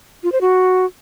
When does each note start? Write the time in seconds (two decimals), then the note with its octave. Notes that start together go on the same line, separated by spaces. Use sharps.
0.23 F4
0.32 C5
0.41 F#4